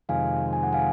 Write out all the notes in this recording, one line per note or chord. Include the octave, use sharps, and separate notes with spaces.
F2 C3 D#3 G#3 F5 G#5
G#5
F#5
F5 G#5